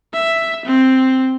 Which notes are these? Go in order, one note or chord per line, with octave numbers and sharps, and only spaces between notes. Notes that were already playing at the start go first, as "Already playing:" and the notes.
E5
C4